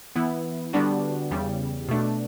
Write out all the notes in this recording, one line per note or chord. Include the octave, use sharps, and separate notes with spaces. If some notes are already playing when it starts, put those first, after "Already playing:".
E3 B3 E4
D3 G3 B3 D4 F#4
E2 C#3 G3
B2 A3 D4